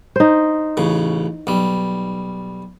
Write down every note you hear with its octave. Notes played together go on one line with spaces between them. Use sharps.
D#4 C5
A1 C#3
B1 G3